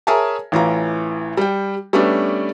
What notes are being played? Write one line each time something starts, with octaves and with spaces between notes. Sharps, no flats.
G#4 A#4 C#5 E5 G#5 A5
A1 E3 F4 A#5
G3 G5
G3 A3 B3 C#4 D4